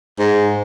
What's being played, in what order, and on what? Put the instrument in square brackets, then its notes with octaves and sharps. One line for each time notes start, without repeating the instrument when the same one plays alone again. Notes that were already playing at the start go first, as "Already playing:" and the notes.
[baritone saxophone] G#2